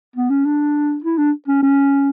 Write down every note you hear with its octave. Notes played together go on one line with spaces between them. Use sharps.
B3
C#4
D4
E4
D4
C#4
C#4